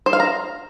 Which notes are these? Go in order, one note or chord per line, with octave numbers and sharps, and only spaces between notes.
C5
F5
A#5